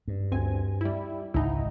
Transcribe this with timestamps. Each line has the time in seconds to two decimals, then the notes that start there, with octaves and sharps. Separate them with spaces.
0.08 G2
0.32 D2 C4 G#5
0.81 G3 E4
1.34 G#1 C#2 D#4 E4